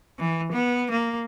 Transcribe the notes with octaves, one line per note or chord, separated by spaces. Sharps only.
E3
B3
A#3